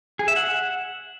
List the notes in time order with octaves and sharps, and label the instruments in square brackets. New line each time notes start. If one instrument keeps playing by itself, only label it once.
[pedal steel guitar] G#4
E5
F#5